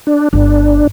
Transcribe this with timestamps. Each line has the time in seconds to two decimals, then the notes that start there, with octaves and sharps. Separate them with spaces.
0.07 D4
0.33 G1 D4